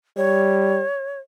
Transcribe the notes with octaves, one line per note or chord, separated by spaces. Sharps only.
G3 C#5